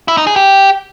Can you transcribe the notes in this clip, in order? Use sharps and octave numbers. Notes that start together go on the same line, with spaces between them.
E4
D#4
G#4
G4